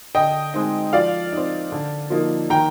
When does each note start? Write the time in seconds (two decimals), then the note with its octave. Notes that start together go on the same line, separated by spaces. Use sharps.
0.15 D3 D#5 G5
0.54 G#3 C4 D#4
0.93 F3 D5 F5
1.32 C4 D#4
1.72 D3
2.10 F3 A#3 D#4
2.50 D#3 G5 A#5